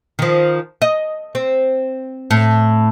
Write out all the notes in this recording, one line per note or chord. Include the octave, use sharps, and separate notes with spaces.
D#3 F3
D#5
C4
A2